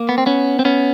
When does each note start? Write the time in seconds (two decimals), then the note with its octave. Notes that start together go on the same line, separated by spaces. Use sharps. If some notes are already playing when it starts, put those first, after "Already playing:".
Already playing: A#3
0.09 B3
0.18 C4
0.26 B3 C#4
0.59 C4
0.65 B3 C#4